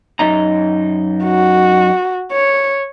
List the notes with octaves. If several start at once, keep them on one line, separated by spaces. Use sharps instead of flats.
F#2 D#4 A#5
F#4
C#5